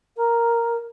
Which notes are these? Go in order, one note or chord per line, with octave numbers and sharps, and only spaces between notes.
A#4